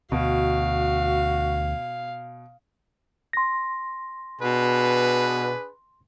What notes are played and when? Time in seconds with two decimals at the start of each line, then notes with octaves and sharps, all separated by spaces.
0.12 D2 B2 F#4 F5
3.33 C6 A#6
4.42 B2 D4 G#4 B4